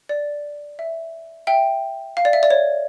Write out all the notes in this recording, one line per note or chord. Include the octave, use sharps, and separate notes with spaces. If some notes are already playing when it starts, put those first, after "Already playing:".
D5
E5
E5 G5
F5
D5
E5
D5
C#5